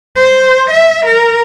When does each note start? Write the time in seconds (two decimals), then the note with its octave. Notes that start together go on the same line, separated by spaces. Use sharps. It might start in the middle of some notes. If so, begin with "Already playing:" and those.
0.16 C5
0.71 E5
1.06 A#4